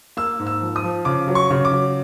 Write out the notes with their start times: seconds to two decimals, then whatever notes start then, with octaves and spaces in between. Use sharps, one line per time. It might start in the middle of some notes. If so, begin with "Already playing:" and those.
0.17 A#3 E6
0.39 G#2
0.47 E6
0.61 F3
0.76 D#6
0.83 F3
1.05 C#3 D6
1.28 F#3
1.35 C#6
1.50 C#3
1.65 D6
1.72 F#3